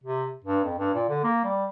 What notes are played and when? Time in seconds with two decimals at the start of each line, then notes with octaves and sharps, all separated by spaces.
0.04 C3
0.45 G2
0.64 F2
0.79 G2
0.94 A#2
1.09 D3
1.24 A#3
1.44 G3